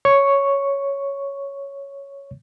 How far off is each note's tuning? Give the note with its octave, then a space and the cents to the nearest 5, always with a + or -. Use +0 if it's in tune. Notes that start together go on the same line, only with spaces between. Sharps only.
C#5 +0 C#6 +0